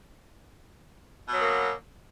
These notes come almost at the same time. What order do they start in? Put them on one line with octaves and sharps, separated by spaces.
B2 F#3 B3 A#3